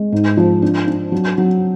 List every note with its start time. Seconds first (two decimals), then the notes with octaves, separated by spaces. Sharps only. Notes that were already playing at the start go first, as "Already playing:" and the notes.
Already playing: G#3
0.12 G#2
0.37 F3
0.62 D4
0.87 D4
1.12 F#3
1.38 F#3